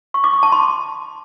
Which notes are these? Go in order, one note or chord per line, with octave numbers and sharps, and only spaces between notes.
C#6
D6
C#6
A5
C6